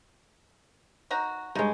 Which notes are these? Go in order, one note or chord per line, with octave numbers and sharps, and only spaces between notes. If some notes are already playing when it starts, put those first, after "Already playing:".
D#4 F#4 A#5
G2 G#3 D#4 C#5